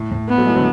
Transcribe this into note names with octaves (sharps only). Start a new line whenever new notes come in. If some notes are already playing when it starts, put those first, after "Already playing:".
Already playing: A2
A2
B3
F#3 A3
E3 G#3
D3 F#3